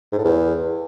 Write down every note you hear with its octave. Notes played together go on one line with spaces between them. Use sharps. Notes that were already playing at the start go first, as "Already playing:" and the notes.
G#2
A2
E2